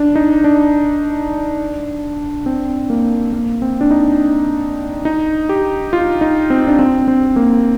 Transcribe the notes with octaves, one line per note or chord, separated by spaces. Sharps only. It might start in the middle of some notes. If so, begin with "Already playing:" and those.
Already playing: D4
D#4
D4
C4
A#3
A#3
C4
D4
D#4
D#4
G4
F4
D#4
C4
D4
C4
C4
A#3